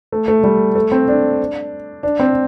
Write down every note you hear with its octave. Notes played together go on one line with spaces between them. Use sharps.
A3
A3
G3
A3
C4
D4
D4
C4